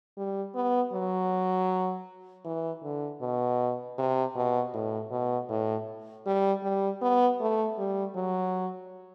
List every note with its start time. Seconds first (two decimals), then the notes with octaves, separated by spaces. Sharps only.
0.17 G3
0.55 B3
0.93 F#3
2.45 E3
2.83 D3
3.21 B2
3.98 C3
4.36 B2
4.74 A2
5.11 B2
5.49 A2
6.26 G3
6.63 G3
7.02 B3
7.40 A3
7.79 G3
8.15 F#3